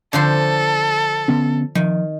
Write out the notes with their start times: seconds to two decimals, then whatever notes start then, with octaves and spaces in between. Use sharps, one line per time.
0.13 D3 F3 A4 C5
1.28 D3 B3 C#4
1.75 D#3 F3